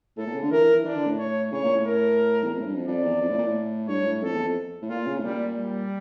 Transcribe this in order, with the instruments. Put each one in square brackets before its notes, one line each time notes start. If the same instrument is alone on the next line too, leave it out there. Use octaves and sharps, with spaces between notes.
[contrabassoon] A2 [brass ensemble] A4
[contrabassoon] A#2
C#3
D3
[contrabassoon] E3 [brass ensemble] A#4
[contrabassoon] E3
E3
[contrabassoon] E3 [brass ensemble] D4
[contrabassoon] D3
A2
[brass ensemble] C#5
[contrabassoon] C#3 [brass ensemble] C#5
[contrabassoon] A#2
A2
[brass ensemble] A#4
[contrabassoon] E2
F2
A2
G2
F2
[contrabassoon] F2 [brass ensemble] D5
[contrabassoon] E2
F2
A2
A#2
A2
[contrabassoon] G2 [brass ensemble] C#5
[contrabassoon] G2
A2
[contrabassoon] F2 [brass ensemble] A4
[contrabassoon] E2
F2
A2
[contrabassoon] A#2 [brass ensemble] F4
[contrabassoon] C#3
A2
[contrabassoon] A#2 [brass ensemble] G3
[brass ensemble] G3